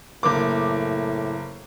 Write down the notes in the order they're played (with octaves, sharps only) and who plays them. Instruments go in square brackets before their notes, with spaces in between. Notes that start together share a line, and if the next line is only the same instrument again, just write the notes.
[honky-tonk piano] F#1 A#3 D6 [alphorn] A2